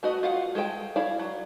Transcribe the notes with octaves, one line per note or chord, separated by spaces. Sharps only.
A3 F#4 B4 D#5
F4 F5 F#5
G#3 A4 B4 G5
E4 C#5 D5 F5
F#3